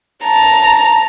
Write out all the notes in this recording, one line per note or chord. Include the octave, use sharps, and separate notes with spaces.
A5 A#5